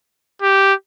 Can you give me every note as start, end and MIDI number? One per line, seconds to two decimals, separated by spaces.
0.42 0.74 67